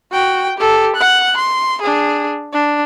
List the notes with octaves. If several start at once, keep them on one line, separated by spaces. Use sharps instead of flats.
F#4 G5
G4 A4
F#5 F#6
C6
D4 G#4
D4